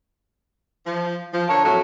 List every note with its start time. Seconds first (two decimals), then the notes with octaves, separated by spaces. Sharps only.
0.85 F3
1.32 F3
1.47 D3 A#4 C#5 A5 A#5
1.63 F2 A2 F#3